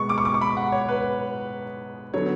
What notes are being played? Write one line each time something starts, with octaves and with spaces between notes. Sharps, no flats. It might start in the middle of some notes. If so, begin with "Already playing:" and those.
Already playing: B2 G#3 B3 C#6
D6
C#6
D6
C#6
B5
F#5
C#5
B4
D3 F#3 B3 C#5